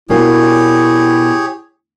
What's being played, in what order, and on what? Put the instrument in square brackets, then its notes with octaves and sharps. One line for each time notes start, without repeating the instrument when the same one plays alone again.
[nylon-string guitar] B2 A#3 D4 [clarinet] E4 [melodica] G4 G#4 C#5